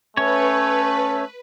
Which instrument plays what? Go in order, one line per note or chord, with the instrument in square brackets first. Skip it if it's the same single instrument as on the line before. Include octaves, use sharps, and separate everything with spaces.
[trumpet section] A3 [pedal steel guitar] C#4 C#5 [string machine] B4